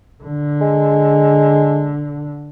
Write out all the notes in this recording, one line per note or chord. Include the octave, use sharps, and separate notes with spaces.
D3
G#3